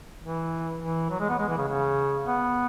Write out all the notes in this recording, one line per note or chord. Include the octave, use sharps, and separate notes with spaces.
E3
E3
F#3
G#3
B3
G#3
E3
C#3
C#3
B3